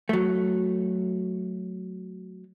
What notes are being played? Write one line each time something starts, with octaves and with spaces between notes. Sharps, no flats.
F#3 A3